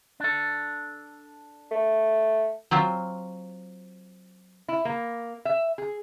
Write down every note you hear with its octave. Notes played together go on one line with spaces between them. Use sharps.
D4 A4
A3
F#3 C4 F4
E4
A#3
E5
G#4